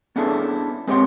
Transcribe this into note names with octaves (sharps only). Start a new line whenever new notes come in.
B3 C#4 D4 E4 G#4 A4
G#3 C4 G4 C#5 F#5 C6